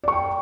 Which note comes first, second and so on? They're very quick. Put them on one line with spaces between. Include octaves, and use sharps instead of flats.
D5 C#6 G5